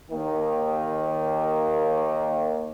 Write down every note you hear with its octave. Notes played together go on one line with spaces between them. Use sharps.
D#2 D#3 A#3